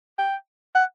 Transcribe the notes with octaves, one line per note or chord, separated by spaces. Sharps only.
G5
F#5